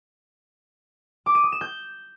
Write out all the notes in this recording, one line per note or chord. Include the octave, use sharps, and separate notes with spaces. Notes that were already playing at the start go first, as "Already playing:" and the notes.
D6
D#7
D#6
E7
G6